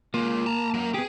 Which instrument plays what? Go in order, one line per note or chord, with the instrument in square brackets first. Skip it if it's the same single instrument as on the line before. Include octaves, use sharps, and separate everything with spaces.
[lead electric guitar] G#3 F4 [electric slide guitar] A#3
[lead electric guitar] A5 A#5
F#3 A#4
[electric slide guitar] B3 G4 [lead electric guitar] G#4